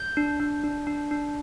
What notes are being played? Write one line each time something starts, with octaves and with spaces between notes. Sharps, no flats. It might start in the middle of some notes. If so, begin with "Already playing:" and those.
Already playing: G6
D4
D4
D4
D4
D4